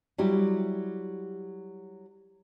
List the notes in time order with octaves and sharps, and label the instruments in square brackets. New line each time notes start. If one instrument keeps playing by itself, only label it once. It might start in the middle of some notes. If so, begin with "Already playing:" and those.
[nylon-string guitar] F#3 G3 E4 G4